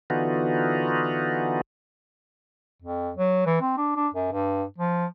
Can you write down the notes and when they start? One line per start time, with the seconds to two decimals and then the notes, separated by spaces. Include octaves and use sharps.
0.10 D3 E3 B3 D#4 F4 F#4
2.82 F2
3.17 F#3
3.46 E3
3.61 C4
3.78 D4
3.96 D4
4.14 F#2
4.33 G2
4.78 F3